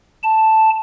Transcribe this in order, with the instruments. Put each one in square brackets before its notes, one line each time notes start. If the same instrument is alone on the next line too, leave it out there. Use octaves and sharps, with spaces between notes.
[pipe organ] A5